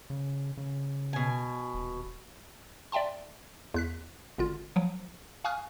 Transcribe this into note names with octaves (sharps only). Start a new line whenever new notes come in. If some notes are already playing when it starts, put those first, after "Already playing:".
C#3
C#3
B2 G#5
D#1
D5 E5 G5 A5 C6
E2 F#6 B6
G#1 D3 F4
F3 F#3
F5 G#5 C#6 D#6 F6 F#6